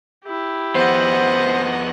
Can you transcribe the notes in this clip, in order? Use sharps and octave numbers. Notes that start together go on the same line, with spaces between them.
E4 G4
F2 B3 C5 D#5 F#5